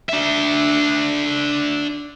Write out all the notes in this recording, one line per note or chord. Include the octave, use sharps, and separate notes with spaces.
D4 E5